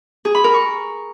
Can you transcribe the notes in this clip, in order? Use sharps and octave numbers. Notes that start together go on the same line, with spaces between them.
G#4
B5
A#4
C#6